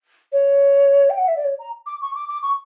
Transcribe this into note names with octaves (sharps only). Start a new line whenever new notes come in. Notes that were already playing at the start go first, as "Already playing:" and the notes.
C#5
G5
F#5
E5
D5
C#5
A#5
D6
C#6
D6
D6
C#6